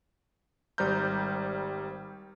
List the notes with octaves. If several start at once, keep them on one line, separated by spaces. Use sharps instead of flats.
G#1 G3 C5 A#5 F6 G6